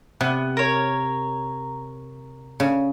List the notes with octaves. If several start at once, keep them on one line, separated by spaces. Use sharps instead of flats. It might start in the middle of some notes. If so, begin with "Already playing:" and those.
C3 B3
A#4 C#5
C#3